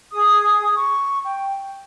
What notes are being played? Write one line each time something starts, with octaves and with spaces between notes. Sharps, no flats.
G#4 D#6
C#6
G5